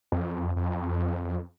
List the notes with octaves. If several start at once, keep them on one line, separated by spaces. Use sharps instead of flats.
F2
F2